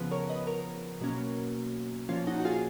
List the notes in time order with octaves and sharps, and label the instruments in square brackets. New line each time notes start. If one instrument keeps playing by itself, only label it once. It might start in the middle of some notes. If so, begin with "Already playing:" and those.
Already playing: [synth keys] C#3 F3 B3
A#4 C#5
B4 D#5
A#4 C#5
B2 F#3 A#3 C#4
A#2 F3 A#3 C#4 F4
D#4 F#4
F#4
F4 G#4